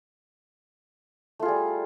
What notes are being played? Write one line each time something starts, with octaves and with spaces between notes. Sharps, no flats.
G3 A3 F4 G#4